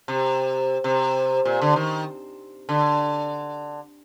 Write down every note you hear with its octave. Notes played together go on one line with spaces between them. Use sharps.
C3
C3
A#2
D3
D#3
D3